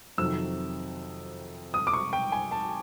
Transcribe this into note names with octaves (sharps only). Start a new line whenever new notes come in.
F2 C3 D#3 F#3 E6
D#6
D6
C#6
G5
G#5
A5